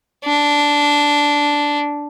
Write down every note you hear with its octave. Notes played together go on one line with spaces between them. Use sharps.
D4